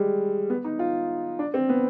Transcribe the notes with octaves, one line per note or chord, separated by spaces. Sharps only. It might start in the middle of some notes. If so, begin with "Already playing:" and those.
Already playing: G3 G#3
B3
D#4
F4
D4
C4
B3